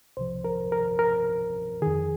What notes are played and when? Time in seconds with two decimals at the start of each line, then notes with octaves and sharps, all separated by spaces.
0.17 C2 C3 F3 C5
0.44 A#4
0.72 A#4
0.99 A#4
1.82 F2 D#3 G#4